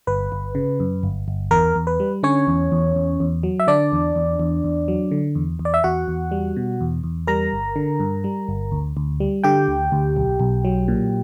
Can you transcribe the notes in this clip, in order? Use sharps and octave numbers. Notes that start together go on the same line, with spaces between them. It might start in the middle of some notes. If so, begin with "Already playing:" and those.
G1 B4
G1
C#3
F#2
G1
G1
E2 A#4
E2
B4
G3
D3 C#4 C#5
E2
E2
E2
E2
F#3
E5
D3 D4 D5
E2
E2
E2
E2
F#3
D3
E2
E2
D5
E5
E2 F#4 F#5
E2
G3
B2
E2
E2
G3 A#4 A#5
G1
D3
G2
G3
G1
D2
D2
G3
D3 G4 G5
D2
D2
B1
B1
F#3
A#2